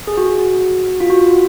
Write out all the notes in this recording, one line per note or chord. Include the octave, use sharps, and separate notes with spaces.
G#4
F#4
F4
F#4